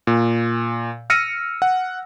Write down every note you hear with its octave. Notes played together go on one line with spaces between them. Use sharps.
A#2
E6 F6 A#6 C#7 D#7
F#5